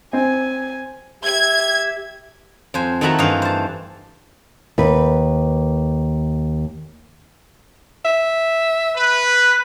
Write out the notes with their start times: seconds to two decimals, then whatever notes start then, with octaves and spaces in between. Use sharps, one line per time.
0.13 C4 G#5
1.24 G4 E5 G#6
2.74 F2 C5 G#5
3.01 D#3 A3 E4 F#4 E5 A#5
3.19 G2 E3 D#4 C5 F5
3.42 C5 A5
4.78 D#2 B4
8.05 E5
8.95 B4